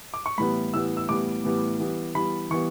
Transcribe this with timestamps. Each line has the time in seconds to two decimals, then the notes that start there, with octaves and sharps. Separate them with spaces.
0.14 D6
0.26 C#6
0.38 A2 E3 G3 B3 B5
0.74 A2 E3 G3 B3 E6
0.97 E6
1.09 A2 E3 G3 B3 D6
1.44 A2 E3 G3 B3
1.80 E3 G3 B3
2.15 E3 G3 B3 B5
2.50 E3 G3 B3 C#6